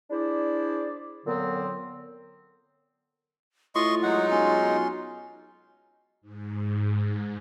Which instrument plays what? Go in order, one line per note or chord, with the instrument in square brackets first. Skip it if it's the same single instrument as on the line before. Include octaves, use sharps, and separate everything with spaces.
[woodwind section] D4 E4 G#4 C5 D5
A#2 D3 F#3 B3 C4
[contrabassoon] A2 [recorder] F4 [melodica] D#5 C6 C#6
[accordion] F#3 G#3 D#4 [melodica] F#5
[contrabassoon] B1 [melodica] C#4 C6
[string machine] G#2